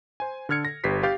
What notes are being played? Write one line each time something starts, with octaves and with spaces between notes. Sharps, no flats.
C5 G#5
D3 A4 F6 G#6 C#7
A#6
G1 G4 B4 B6 C7
G4 F5 D6 G6 A6 B6